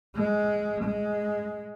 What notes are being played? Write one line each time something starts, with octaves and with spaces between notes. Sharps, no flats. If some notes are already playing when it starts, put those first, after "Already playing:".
G#3
G#3